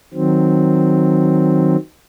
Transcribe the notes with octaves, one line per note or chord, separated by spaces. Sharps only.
D#3 F#3 C4